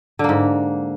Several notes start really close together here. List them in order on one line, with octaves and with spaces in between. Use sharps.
D3 A#3 G#2